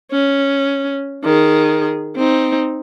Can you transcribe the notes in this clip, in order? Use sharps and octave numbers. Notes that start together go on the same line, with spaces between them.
C#4
D#3 G#4
C4 D#4